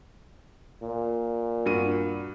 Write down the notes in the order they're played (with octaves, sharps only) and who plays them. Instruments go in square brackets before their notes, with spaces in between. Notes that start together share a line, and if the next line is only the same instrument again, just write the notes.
[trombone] A#2
[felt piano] G2 F#4 D#7